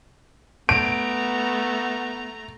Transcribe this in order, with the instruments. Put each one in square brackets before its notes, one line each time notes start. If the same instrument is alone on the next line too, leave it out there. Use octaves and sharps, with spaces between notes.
[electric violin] A3 A#5 [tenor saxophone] B3 [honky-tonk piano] D7